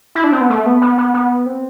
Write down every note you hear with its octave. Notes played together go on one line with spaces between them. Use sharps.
E4
D4
C4
B3
A3
B3
B3
B3
B3
C4